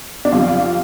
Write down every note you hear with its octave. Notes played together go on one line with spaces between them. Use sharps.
D4
F2 C3 F3 F4